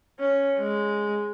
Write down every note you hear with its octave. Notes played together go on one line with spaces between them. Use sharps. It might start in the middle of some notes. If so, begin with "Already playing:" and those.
C#4
G#3